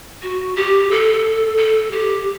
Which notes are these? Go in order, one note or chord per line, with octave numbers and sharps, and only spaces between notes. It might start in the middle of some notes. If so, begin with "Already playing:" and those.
F#4
G4
A4
A4
G4